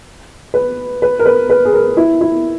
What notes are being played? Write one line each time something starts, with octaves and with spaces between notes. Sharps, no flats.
B4
B4
A#4
B4
B4
G#4
A#4
E4
E4